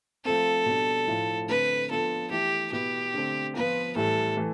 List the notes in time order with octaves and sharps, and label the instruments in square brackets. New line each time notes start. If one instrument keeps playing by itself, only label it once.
[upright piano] F3 A3 C4 [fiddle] A4
[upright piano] B2 G3 D4
A2 F3 A3 E4
[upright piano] D3 A3 C4 [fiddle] B4
[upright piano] F3 B3 D4 F4 [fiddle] A4
[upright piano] E3 A3 E4 [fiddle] G4
[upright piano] B2 B3 E4 [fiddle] G4
[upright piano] D3 A3 C4
[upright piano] F3 B3 F4 [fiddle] B4
[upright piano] A2 E3 G3 [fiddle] A4
[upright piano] E3 A3